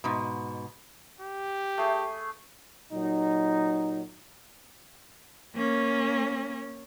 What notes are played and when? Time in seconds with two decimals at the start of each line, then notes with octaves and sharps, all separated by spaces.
0.04 G#2 B2
1.21 G4
1.78 A3 G#4
2.92 A#2 F#3 D#4
5.55 A#3 C#4